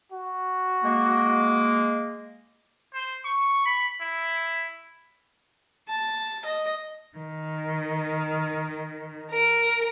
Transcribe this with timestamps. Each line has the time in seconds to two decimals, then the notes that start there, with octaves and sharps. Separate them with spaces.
0.12 F#4
0.84 G#3 A#3
2.94 C5
3.24 C#6
3.65 B5
4.01 E4
5.89 A5
6.45 D#5
7.17 D#3
9.30 A#4